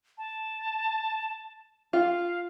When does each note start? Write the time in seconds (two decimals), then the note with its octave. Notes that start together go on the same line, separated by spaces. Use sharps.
0.18 A5
1.93 F4 F5